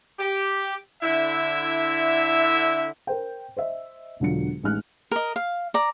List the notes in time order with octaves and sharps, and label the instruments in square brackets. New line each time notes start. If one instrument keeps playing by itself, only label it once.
[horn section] G4
D3 E4 E5
[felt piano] A#4 C5 G5
C5 D#5 E5
E1 D3 F#3 F4 C#7
A1 G#3 D#4 F6 F#6
[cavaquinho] A#4 D#5
F5
D5 A#5